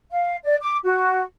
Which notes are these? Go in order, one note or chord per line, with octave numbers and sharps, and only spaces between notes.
F5
D5
D6
F#4